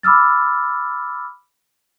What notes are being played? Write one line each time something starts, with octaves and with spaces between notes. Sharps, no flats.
B5 D6 E6 F6 A6